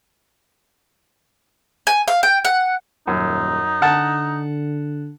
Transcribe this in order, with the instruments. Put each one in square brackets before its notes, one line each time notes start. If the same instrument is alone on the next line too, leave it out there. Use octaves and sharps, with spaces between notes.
[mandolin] G#5
F5
G5
F#5
[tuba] D#1 [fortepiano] F#2 [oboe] D#4
[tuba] D3 [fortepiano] F#5 A5